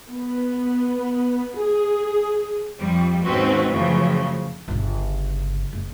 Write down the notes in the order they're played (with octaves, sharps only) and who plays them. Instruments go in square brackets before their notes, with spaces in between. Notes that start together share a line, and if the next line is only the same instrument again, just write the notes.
[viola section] B3
G#4
[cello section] F2 G3
D#2 G#2 C4 C#4 F#4 B4
F#2 A2 C#3 E3 F3
[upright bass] G1 C#3
F#1